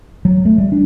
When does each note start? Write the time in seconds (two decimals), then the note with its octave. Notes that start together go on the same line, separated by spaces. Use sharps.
0.25 F#3
0.45 A3
0.58 G3
0.72 D4